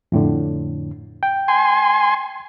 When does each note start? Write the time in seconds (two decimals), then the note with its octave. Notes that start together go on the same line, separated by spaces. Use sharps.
0.12 F2 A2 D3
1.23 G5
1.48 G#5 C6